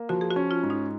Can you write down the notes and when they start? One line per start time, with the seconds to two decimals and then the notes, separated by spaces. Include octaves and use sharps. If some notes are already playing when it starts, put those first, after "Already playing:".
Already playing: A#3
0.09 F3 F#4
0.21 G#4
0.31 F#4
0.36 C#4
0.51 F4
0.63 G#2
0.70 D#4